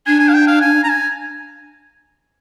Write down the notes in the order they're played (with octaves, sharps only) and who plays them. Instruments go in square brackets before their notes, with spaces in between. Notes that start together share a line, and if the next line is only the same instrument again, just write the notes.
[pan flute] D4 [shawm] G#5
[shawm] G#5
F5
G5
F5
G#5
A#5
G#5